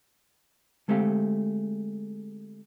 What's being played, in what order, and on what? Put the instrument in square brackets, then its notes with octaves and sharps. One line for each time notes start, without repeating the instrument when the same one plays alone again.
[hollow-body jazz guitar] D3 G#3 A3 C4 G4 F5